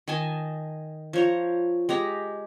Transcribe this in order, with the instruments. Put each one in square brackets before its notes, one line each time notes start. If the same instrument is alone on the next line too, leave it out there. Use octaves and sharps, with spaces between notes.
[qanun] D#3 D#5 G#5 A5
F3 C#5 A#5
G#3 G4 A#5